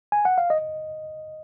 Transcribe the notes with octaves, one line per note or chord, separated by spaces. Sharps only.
G#5
F#5
F5
D#5